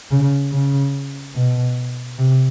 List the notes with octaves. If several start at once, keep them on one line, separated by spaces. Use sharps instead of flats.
C#3
C#3
B2
C3